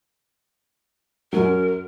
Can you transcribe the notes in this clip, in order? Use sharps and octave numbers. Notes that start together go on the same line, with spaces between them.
F#2 F#3 A#4